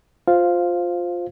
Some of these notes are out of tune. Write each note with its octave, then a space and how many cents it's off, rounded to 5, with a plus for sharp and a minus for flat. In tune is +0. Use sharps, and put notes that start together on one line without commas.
F4 +15 C5 +0 F5 +0